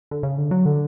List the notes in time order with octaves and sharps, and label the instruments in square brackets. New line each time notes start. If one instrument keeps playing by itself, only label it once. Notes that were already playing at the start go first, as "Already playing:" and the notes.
[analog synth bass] D3
C#3
D3
F#3
D3